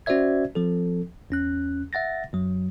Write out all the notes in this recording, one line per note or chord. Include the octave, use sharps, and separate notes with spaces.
C#4 F#4 C5 D5 E5 G#6
F3 C4 A4
E2 C#4 F#6
E5 F#5 A6 A#6
F#2 F#3